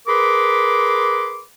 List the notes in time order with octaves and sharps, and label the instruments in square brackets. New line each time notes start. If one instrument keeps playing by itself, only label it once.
[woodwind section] G#4 A#4 B4 B5 C6 D6